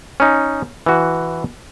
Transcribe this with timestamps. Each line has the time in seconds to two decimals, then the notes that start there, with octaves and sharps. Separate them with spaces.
0.20 C#4 D#4
0.86 E3 F#4